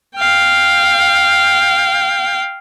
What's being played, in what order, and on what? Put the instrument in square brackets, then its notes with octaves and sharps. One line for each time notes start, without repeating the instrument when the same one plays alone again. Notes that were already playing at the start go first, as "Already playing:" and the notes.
[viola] F5 G5